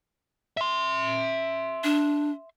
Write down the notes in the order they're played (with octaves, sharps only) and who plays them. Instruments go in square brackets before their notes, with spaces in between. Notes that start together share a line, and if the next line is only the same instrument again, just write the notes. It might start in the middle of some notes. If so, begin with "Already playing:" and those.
[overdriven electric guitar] E5 C6
[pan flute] D4